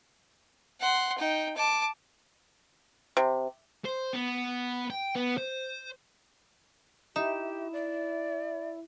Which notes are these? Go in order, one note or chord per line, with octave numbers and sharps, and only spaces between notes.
F#5 C6
D#4 G5
A5 D6
C3
C5
B3
G5
B3
C5
D#4 E4 G4 E5
D5